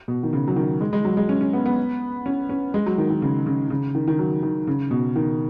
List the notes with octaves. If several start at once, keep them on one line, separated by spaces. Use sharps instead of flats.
B2
D#3
C#3
F#3
D#3
G#3
G#3
F#3
G#3
C#4
C#4
B3
B3
C#4
C#4
G#3
F#3
D#3
D#3
C#3
C#3
C#3
D#3
D#3
F#3
D#3
C#3
B2
D#3